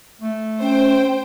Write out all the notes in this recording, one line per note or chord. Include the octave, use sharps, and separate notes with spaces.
A3
C#4 C5 G5